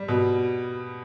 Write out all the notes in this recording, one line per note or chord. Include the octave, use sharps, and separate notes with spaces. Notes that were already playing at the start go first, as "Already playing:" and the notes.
Already playing: G3
B2